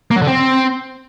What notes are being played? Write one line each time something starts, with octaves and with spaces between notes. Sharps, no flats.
A#3
F#3
D3
C4